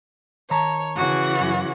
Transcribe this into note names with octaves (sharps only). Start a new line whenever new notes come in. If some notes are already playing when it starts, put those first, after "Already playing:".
D#3 C#5 A5 A#5
C#3 E3 F#4
F#2